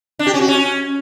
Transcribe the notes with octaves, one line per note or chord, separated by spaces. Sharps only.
D4
G4
C#4
F#4
C#4